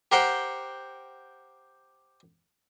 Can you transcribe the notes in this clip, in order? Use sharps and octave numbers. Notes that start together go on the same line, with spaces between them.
G4 A#4 C5 F#5 G5